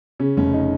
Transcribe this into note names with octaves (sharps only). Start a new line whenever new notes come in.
C#3 C#4
F1 C#4
D#4